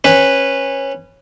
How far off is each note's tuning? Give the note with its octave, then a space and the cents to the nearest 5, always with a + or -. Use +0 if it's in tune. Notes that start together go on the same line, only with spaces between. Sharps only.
C#4 -20 B4 +0